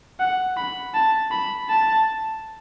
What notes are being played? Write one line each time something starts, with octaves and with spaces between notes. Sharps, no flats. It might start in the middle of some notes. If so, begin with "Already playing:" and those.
F#5
B5
A5
B5
A5